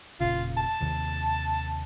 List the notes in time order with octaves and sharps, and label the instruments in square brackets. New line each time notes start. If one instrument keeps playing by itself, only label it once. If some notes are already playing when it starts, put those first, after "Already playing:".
[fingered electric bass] E1 A#2 C#3 [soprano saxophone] F4
[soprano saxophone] A5
[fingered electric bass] D#2 C3 D#3